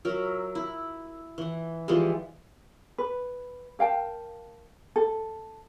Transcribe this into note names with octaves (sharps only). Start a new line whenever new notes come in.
F#3 A#4 E5
E4
E3 F#5
E3 F3 G3 G#3
B4
A#4 F5 G5 A5
A4